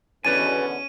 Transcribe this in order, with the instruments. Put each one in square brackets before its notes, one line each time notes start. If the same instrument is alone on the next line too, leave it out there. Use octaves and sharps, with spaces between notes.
[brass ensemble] E2 B2 D3 [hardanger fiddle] C#4 [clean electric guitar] B4 D5 G#5 [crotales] D#7